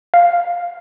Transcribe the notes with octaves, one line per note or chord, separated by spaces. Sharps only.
F5